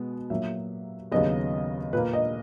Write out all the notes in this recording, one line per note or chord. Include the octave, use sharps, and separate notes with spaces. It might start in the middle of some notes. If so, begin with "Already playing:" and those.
Already playing: B2 G#3 B3
A#2 F#3 A#3 E5
D#2 C#3 F#3 B3 D#5
A#2 A#3 B4
D#5